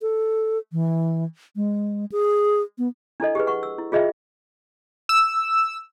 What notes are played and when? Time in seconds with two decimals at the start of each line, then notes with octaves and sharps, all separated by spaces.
0.02 A4
0.72 E3
1.56 G#3
2.12 G#4
2.78 B3
3.20 D4 E4 A4 D#5
3.35 G4 G#4 B4
3.47 F#5 C#6
3.63 E6
3.78 E4
3.92 F4 G#4 D#5 E5 G5
5.09 E6